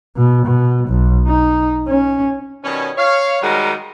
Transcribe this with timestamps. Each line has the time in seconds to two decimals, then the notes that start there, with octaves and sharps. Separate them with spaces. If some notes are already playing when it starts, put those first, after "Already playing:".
0.16 B2
0.46 B2
0.89 B1
1.27 D#4
1.88 C#4
2.64 B2 D#3 G3 C#4
2.97 C#5 F5
3.42 D#3 G3 G#3 F#4 A#4